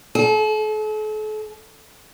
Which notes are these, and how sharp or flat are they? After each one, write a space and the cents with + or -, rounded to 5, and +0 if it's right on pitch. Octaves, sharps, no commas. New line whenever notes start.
A4 -40